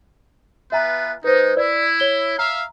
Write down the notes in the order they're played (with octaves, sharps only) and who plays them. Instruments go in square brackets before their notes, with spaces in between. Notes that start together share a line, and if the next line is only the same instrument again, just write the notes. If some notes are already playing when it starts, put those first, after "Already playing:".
[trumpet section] B3 F4 B4 [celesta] E5 G#5 A#5
[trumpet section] G#3 D#4 [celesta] B4 C5
[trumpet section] E4 [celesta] D5
[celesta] C#5 G7
[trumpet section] E5 F5 [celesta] A#5